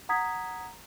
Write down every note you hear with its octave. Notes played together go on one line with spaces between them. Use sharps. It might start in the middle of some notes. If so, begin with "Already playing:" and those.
F#5 A#5 D#6 G#6 B6